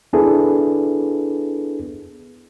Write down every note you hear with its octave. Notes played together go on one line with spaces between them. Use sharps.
B3 D4 E4 G#4 A4 B4